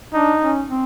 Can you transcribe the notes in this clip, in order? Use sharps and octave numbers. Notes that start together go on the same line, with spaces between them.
D4 D#4
C#4
C4